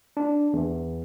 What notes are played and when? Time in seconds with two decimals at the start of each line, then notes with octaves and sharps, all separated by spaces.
0.17 D4
0.53 E2